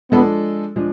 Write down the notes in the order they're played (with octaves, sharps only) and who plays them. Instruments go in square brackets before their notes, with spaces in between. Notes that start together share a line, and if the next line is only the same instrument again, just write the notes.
[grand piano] F3 G#3 D4 A4 [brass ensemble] B3
[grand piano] F3 G#3 D4